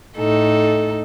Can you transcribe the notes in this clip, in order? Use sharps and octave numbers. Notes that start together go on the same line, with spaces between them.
A2 D#4 A4